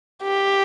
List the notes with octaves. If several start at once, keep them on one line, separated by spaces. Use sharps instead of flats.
G4